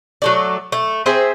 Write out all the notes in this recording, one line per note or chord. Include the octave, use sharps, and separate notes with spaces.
F#3 A3 D5
A3
C4 G#4 C5 E5